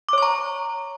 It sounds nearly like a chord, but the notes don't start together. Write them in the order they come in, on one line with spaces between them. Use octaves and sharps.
D6 C#5 C#6 A#5